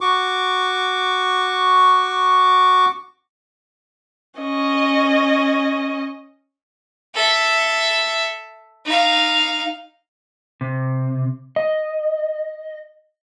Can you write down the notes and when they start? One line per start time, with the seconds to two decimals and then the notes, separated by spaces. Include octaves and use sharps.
0.01 F#4 C#6 D6
4.41 C#4 D#5
7.15 A4 E5
8.86 D#4 F5
10.61 C3
11.56 D#5